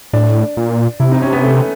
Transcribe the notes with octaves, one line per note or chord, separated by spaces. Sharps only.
A2 D4
A#2
C3 E4
D#4
C#4
B3
A3